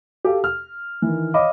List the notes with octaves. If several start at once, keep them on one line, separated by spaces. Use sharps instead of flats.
G4 A4 F5
F6
D#3 E3
C#5 D#5 F5 B5 D6